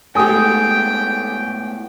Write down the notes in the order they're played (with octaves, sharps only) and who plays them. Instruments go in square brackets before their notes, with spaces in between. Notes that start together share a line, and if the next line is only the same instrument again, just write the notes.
[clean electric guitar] A2 G#3 B3 [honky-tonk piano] A3 G4 [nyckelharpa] G5 [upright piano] G#5 D#6